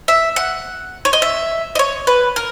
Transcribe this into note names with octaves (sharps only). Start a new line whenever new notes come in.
E5
F#5
C#5
D#5
E5
D#5
C#5
B4
A#4